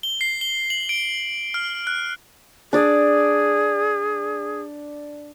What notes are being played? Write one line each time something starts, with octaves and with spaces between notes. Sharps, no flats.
G7
C7
G7
F#7
D7
F6
F#6
D4 G#4 D5